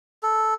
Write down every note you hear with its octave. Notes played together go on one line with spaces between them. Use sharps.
A4